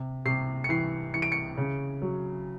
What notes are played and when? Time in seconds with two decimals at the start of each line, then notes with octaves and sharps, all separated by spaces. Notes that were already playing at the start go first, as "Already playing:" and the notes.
Already playing: C3
0.25 C3 C7
0.64 C#7
0.69 E3 C7
1.14 E3 C#7
1.22 D7
1.32 C#7
1.57 C#3
2.02 F#3